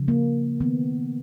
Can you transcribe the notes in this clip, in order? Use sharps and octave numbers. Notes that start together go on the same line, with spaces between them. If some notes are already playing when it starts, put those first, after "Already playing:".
Already playing: C#3 F3
A#3
D#3 A#3 B3